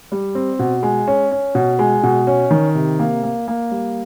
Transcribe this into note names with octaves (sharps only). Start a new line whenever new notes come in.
G3
C4
B2
G#3
C#4
C#4
B2
G#3
B2
C#4
D#3
C3
A#3
A#3
A#3
G3